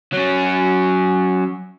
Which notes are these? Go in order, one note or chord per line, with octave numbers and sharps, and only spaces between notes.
F#3 C#4